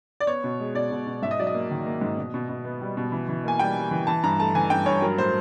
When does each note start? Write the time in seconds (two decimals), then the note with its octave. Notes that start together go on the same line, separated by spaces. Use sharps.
0.20 D5
0.27 B3 C#5
0.44 B2
0.60 G#3
0.75 B2 D5
0.91 B2
1.07 B2
1.22 G#2 E5
1.31 D#5
1.39 F#3 D5
1.47 D#5
1.54 A#3
1.71 D#3
1.86 A#3
2.01 G#2
2.17 B2
2.34 B2
2.49 B2
2.65 B3
2.81 G3
2.97 B2
3.12 E3
3.29 E3
3.45 A#3 G#5
3.59 G3 G5
3.76 G3
3.91 E3
4.07 E3 A5
4.23 G2 A#5
4.39 A3 A5
4.55 E3 G#5
4.70 G2 G5
4.86 G2 C#5
5.02 F#3 A#4
5.18 A2 C5